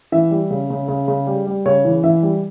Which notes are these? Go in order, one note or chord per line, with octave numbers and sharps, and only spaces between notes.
E3 E5
G3
C#3
C#3
C#3
C#3
G3
G3
C#3 C#5
E3
E3 E5
G3